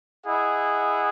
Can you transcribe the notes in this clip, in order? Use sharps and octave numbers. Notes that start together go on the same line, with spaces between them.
E4 G#4 D#5 F#5